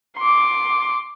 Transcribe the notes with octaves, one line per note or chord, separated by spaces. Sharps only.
C6 D6